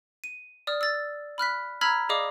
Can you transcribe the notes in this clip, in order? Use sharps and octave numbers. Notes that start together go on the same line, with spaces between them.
D#7
D5 D#6 F6
E6 A6
B5 F6 F#6 B6
A#5 B5 E6 F6 G#6 B6
G#4 D5 D#5 F5 D6 D#6